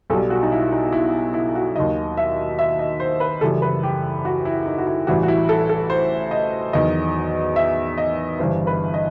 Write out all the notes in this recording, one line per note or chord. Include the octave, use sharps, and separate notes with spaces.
B1 B2 G3 A4
F#4
D#4
E4
D#4
E4
E4
F#4
D#2 D#3 F#3 D#5
E5
E5
D#5
C5
B4
F#1 F#2 E3 G3 A4
B4
G4
F#4
E4
D#4
F#4
E4
A1 A2 E3 G3 F#4
F#4
E4
A4
A4
C5
D#5
E2 D#3 F#3 D#5
E5
D#5
G1 G2 E3 C5
B4
D#5